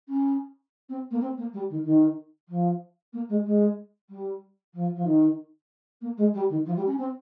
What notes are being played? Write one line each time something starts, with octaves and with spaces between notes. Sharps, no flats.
C#4
C4
A#3
C4
A#3
G3
D#3
D#3
F3
A#3
G#3
G#3
G3
F3
F3
D#3
A#3
G#3
G3
D#3
F3
G3
C#4
C4